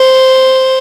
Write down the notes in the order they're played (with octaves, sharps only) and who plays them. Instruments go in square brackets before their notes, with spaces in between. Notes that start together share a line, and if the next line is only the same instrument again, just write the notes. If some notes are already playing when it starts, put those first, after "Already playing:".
Already playing: [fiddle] C5